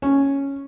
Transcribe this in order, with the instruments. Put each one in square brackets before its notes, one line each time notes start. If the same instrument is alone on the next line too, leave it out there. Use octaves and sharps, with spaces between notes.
[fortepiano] C#4